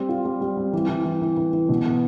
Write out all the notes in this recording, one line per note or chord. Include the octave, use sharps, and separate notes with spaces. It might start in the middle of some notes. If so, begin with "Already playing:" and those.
Already playing: G3 C4
F4
G3
G3
C4
E3
E3
E3
E3
E3
E3
B2
B3